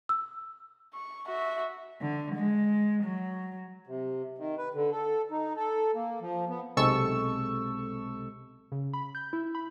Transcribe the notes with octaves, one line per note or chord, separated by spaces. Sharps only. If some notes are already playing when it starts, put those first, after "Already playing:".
E6
C#6
F#4 E5
D3
G#3
F#3
C3
D#3
B4
D3
A4
D#4
A4
A#3
F3
B3
B1 C3 G#3 A4 C#6 E6
C#3
B5
G6
E4
B5